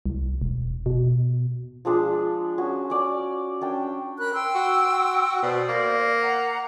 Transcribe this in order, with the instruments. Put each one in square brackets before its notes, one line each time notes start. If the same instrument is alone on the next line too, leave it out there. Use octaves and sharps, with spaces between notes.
[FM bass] C2
E1
B2
[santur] F3 G#3 D4
C#4 F#4
C#4 D5
C#4 D4 G5
[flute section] A#4 B5 F#6
G5 C6 E6
[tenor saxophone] F#4
[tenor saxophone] B2 [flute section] C5 D5
[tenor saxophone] A#3
[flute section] F#5 A#5